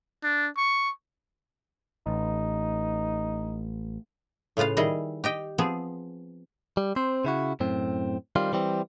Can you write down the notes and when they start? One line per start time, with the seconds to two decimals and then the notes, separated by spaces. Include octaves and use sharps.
0.24 D4
0.57 C#6
2.07 A1 D#4
4.57 A2 C#3 F4 B4 F5
4.77 D#3 G3 E4 G#4 D#5
5.24 G4 D#5 G5
5.58 F3 B3 C4 G#4
6.77 G3
6.96 C4 C5
7.25 C#3 E4 F#4
7.60 F#2 A2 C4
8.36 D#3 G3 C4 F4
8.53 E3 G3 C4